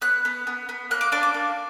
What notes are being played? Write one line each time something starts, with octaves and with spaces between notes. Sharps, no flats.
B3 F#6
B3
B3
B3
A#3 F#6
D6
D4 D6
D6
A#3